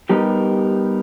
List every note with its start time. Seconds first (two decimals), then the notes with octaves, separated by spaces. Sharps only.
0.09 G3 B3 D#4 G4 A#4